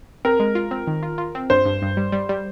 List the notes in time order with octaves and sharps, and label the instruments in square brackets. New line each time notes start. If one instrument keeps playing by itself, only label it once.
[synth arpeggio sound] C4 [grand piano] A#4
[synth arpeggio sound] G#3
F4
C4
D#3
F4
F4
C4
[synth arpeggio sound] G2 [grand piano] C5
[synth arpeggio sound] G2
G2
G3
G3
G3